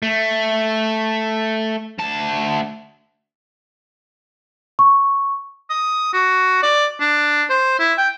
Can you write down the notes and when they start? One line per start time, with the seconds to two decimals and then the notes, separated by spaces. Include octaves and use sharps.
0.03 A3
1.99 D2 A5
4.79 C#6
5.70 D#6
6.13 F#4
6.63 D5
7.00 D4
7.50 C5
7.79 E4
7.98 G5